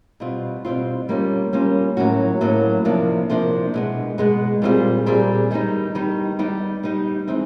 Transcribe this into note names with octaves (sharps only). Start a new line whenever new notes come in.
B2 G3 C4 F4
B2 G3 C4 F4
G3 A#3 C#4 F4
G3 A#3 C#4 F4
A2 F#3 A#3 C#4 F#4
A2 F#3 A#3 C#4 F#4
C3 F3 A#3 D4
C3 F3 A#3 D4
B2 G#3 B3
B2 G#3 B3
A#2 G3 C4 F4 G#4
A#2 G3 C4 F4 G#4
D#3 G3 B3 D#4
D#3 G3 B3 D#4
G3 B3 D#4 G4
G3 B3 D#4 G4
E3 G#3 C4 D#4